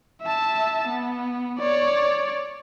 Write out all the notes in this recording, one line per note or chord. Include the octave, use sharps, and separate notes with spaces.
E5 A5
B3
C#5 D5